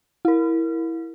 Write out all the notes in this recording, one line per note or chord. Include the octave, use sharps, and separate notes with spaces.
E4 A#4